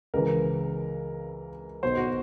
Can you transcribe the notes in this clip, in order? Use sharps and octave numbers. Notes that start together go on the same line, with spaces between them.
C#2 C#3 E3 A#4
B1 B2 C5
F#4